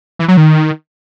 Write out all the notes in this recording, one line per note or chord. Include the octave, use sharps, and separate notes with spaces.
E3
F#3
D#3